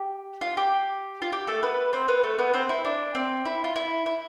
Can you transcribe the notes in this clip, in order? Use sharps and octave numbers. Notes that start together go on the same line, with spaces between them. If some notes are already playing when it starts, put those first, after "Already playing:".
Already playing: G4
F4
G4
F4
G4
A3 A4
B3 B4
C4 C5
B3 B4
A3 A4
B3 B4
C4 C5
E4
D4
C4
E4
F4
E4
E4